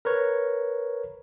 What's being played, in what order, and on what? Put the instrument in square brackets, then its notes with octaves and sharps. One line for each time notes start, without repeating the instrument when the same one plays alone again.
[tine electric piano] A#4 B4 C#5